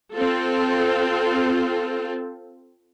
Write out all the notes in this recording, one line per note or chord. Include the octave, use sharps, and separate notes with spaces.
C4 F4 A4